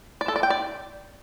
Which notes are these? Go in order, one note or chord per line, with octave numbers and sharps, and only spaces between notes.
D5
A4
D5
G5
D5